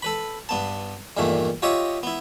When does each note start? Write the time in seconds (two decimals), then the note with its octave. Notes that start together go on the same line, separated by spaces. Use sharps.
0.02 A4 B4 B5
0.49 G2 B3 A5
1.17 E2 G2 A#2 D#3 A3
1.62 F4 G4 C#5 D#5 E5 C6
2.03 B3 E4